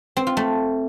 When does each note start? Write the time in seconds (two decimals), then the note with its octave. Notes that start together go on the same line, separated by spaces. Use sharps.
0.17 C4
0.27 F4
0.37 A3